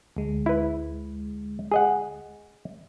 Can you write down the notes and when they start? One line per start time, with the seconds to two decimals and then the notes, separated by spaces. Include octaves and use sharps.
0.17 D2 G#3
0.46 E4 B4
1.72 G#4 D#5 F#5